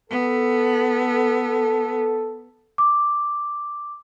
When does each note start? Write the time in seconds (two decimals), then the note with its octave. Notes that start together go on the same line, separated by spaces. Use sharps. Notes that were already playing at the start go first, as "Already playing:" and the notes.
0.10 B3 A4
2.78 D6